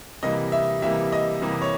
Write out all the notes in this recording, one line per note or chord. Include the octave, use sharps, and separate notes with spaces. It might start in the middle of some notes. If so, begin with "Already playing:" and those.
C3 E3 G3 A#3 D#5
E5
C3 E3 G3 A#3 E5
D#5
C3 E3 G3 A#3
C#5